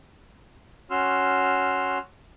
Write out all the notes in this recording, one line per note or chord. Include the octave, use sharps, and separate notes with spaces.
C#4 F#4 C6 E6 F6